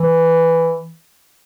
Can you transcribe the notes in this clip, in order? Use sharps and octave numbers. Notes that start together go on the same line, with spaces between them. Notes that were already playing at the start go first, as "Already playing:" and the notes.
Already playing: E3